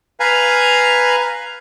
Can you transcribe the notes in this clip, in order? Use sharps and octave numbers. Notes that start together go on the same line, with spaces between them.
B4 F5 G#5 A#5